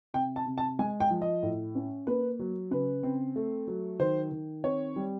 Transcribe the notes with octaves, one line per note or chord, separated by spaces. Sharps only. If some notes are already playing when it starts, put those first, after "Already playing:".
C3 G5
A5
C3
A5
G#3 G#5
G5
F3
D#5
A2
C#4
A#3 B4
F#3
C#3 B4
C4
A3
F#3
D#3 C5
D#3
C4 C#5
G3